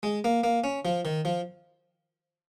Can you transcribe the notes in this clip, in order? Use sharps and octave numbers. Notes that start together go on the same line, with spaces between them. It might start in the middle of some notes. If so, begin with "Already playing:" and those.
G#3
A#3
A#3
C#4
F3
D#3
F3